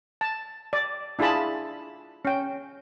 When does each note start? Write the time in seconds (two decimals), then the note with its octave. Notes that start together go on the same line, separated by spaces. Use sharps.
0.21 A5
0.73 D5
1.19 D4 E4 F4 G#4 A5 B5
2.25 C#4 G5